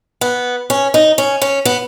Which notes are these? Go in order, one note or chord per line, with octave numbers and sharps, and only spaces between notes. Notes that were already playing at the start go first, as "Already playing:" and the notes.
B3
C#4
D#4
C#4
C#4
B3